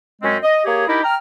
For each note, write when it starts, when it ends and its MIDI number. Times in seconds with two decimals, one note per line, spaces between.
0.22 0.37 42
0.22 0.37 56
0.22 0.37 60
0.22 0.37 61
0.43 0.65 75
0.65 0.87 58
0.65 0.87 67
0.65 0.87 68
0.65 0.87 73
0.88 1.03 63
0.88 1.03 64
0.88 1.03 67
0.88 1.03 70
1.04 1.15 79
1.04 1.15 82
1.04 1.15 89